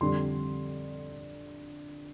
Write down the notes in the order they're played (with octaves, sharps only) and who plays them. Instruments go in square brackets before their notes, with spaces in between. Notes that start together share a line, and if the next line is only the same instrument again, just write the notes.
[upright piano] F2 D3 G3 D4 C6